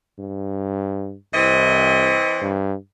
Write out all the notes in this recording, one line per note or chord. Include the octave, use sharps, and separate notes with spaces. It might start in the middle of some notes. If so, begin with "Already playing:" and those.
G2
C2 E3 C4 D#5
G2